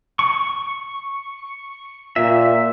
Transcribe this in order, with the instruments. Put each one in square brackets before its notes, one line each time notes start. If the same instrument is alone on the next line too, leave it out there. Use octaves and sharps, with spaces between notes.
[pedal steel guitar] C#6
[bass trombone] A#2 [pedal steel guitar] E5